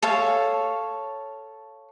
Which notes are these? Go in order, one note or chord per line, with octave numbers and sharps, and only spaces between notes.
A4 C#5 F5